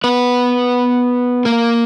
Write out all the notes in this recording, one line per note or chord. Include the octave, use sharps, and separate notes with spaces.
B3 B4
A#3 A#4